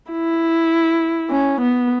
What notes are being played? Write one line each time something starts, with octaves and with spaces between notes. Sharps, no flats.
E4
C#4
B3